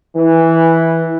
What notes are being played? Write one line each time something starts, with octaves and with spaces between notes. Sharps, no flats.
E3